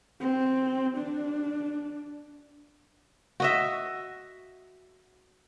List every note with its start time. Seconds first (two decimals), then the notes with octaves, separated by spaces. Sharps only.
0.20 C4
0.98 D4
3.40 F#4 D#5 E5